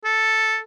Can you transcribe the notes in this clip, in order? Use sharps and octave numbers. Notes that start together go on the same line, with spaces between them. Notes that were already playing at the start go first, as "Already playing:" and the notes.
A4